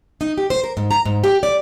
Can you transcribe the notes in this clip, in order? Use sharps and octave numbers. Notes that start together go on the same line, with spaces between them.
D#4
G4
C5
A#4
G#2
A#5
G#2
G4
D5